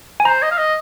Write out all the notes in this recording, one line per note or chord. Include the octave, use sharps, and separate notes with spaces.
G#5
C5 A#5
D#5
F5
D#5